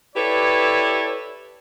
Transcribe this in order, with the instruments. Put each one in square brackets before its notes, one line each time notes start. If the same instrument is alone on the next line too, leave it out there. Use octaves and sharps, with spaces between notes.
[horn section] E4 G4 A4 B4 C#5 D5